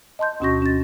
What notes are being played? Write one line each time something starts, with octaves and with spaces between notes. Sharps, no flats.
D#5 A5 C6 G6
D2 B2 C#4 F#4 C#6 A#6
C#4 A6